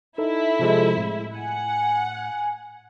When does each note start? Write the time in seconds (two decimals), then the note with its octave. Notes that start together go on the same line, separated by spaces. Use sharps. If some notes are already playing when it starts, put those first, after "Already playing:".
0.18 D#4 E4 A4 E5
0.59 C3 F3 G#3
0.97 A2 G#3
1.35 F#5 G#5